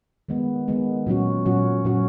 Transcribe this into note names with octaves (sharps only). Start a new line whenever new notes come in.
D#3 G#3 B3
D#3 G#3 B3
A#2 F#3 C#4 F#4
A#2 F#3 C#4 F#4
A#2 F#3 C#4 F#4